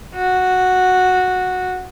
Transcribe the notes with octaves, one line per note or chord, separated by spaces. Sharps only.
F#4